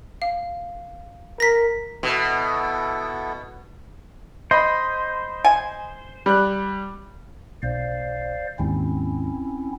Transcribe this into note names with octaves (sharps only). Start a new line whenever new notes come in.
F5
A#4 A#6 B6
B2 B3 E4 A4
C5 D#5 B5
G#5
G3 F#6
B1 C5 D5 F5
D#2 G#2 C4 C#4 E4